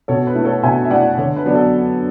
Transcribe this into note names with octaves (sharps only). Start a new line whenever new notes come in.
B2 A4 C#5
B4
A3 E4
A4 C#5
B2 E5 G#5
E5
A3 E4 D5 F#5
D3 A4 C#5
B4
F#3 B3 D4
A4